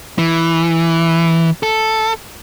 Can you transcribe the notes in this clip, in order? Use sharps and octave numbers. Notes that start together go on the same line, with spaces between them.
E3
A4